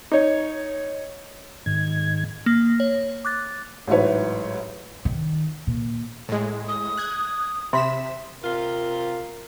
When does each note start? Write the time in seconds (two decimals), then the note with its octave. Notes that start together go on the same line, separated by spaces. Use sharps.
0.12 D#4 C#5
1.66 G#2 D#3 G#6
2.46 A#3
2.80 C#5
3.25 D6 F#6 A6
3.87 A1 G#2 F#3 E4 B4 C#5
5.05 D#3
5.67 A#2
6.29 A2 G#3
6.68 D#6
6.97 F#6 G#6
7.73 C3 E5 B5 C6 B6 E7
8.44 C3 F4 A#4